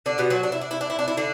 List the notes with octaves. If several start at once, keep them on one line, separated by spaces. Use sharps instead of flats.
D3 D4
B2 B3
F#3 F#4
D4
E4
D4
E4
D4
E4
D4
E4
D3 D4